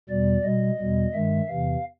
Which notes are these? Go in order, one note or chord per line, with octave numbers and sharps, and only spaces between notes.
E2 B2 G3 D5
B2 G3 D#5
E2 B2 G3
G2 D#3 G#3 E5
E2 C3 E3 F5